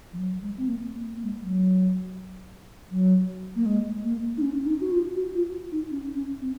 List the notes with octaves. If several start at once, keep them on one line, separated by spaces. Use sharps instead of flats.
F3
F#3
G#3
C4
A#3
A#3
A#3
G#3
F#3
F#3
A#3
G#3
A#3
D#4
C#4
C#4
D#4
F#4
F4
F#4
F4
D#4
C#4
C#4
C4